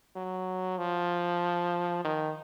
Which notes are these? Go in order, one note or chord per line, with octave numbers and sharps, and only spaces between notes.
F#3
F3
D#3